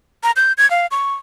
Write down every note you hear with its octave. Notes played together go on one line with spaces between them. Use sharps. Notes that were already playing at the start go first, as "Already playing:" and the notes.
A#5
G6
G#6
F5
C#6